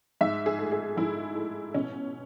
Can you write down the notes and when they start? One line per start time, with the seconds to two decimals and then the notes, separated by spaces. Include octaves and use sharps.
0.21 G#2 E5
0.46 G#4
0.59 A3
0.72 G#4
0.97 G#2 E4
1.36 A3
1.74 B2 C#4